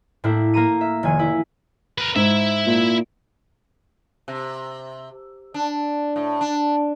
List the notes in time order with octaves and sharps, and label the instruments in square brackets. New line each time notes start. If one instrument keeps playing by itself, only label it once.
[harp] A2 A#3 D4 E4
A#3 A#5 D#7
E5
F1 D#3 G#5
E4
[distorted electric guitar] A#4 B4
[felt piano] G#2 [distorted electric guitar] E4 E5
[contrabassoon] A#2
[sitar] C3
D4
A2
D4